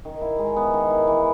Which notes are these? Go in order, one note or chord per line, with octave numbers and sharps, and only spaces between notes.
D#3
E4
G#3
B3
D#3
E4
E3